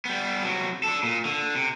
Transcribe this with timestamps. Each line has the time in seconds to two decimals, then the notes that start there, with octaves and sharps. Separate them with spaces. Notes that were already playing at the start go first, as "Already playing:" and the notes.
0.05 G3 B3
0.43 C3 F#3
0.83 D4 A4
1.03 A#2
1.25 D3
1.55 C3